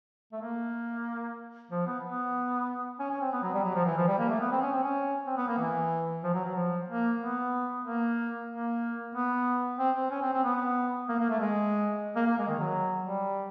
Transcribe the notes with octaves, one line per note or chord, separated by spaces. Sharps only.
A3
A#3
F3
B3
B3
C#4
C#4
C4
B3
F#3
G3
F#3
F3
E3
F3
G3
A#3
A3
B3
C4
C#4
C4
C#4
C4
B3
A#3
E3
F3
F#3
F#3
F3
A#3
B3
A#3
A#3
B3
C4
C4
C#4
C4
C4
B3
A#3
A#3
A3
G#3
A#3
A#3
G#3
D#3
F#3
G3